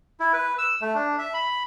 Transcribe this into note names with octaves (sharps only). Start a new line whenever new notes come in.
E4
B4
E6
A3
D4
E5
B5